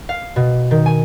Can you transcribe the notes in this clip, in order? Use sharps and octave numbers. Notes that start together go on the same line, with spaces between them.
F5
B2
D#3
G#5